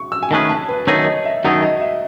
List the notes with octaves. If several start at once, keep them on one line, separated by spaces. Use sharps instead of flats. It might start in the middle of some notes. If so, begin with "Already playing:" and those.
Already playing: C#6
E6
G#5
D#3 A3 C#4 G#4 B4 A5
A5
B4
F#2 D#3 A3 D#4 G#4 C#5
D#5
E5
F#2 D#3 A3 D#4 G#4 F#5
D#5
E5